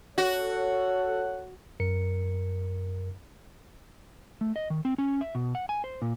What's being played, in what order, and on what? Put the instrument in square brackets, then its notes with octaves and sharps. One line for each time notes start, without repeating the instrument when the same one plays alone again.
[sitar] F#4 [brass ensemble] A4 C#5 F#5
[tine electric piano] F#2 A#4 C#7
[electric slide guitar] A3
D#5
D#3
C4
C#4
E5
B2
F#5
G#5
C5
A#2